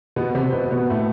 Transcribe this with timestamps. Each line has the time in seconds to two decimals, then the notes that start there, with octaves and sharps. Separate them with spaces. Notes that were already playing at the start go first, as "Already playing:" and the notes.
0.16 B2 B3
0.35 C3 C4
0.52 B2 B3
0.71 B2 B3
0.90 A2 A3